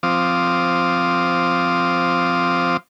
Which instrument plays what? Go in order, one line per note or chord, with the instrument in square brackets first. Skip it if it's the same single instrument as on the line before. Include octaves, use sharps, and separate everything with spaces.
[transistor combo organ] F3 C4 F5 D6 D#6